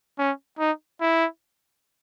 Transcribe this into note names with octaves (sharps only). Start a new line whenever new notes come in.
C#4
D#4
E4